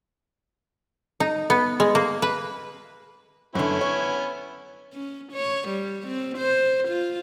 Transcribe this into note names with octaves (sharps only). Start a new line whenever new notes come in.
D#4
B3
G#3
A#3
B4
F#2 D3 B3 C#4 E4
C#5
C#4
C#5
G3
C4
C5
F4